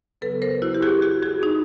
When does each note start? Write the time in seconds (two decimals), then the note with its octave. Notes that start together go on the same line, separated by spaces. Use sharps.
0.21 C#3 F#3 B3 A4 B4
0.42 A#4 C5
0.62 E4 F#4
0.74 G4
0.82 F#4 G#4
1.02 F#4 G#4
1.22 F#4 G#4
1.43 D#4